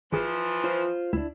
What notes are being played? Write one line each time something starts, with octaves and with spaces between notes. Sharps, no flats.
G#1 E3 F3 G#4
F4 C5
D2 D4 E4